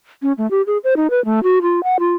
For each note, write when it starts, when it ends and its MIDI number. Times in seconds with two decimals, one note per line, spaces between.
0.22 0.33 61
0.38 0.49 57
0.51 0.62 67
0.67 0.78 68
0.84 0.94 72
0.97 1.07 63
1.10 1.23 71
1.25 1.43 57
1.43 1.59 66
1.62 1.83 65
1.84 1.97 78
2.00 2.15 65